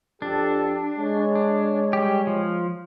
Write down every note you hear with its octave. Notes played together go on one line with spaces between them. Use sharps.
F2 D4 G4 A4
G#3 C#5
D4
G3 G4
F3